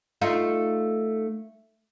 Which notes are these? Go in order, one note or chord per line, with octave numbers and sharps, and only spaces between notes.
A3 D#4 F4